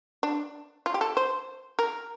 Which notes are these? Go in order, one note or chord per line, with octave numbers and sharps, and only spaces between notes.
D4
F4
G4
A4
C5
A#4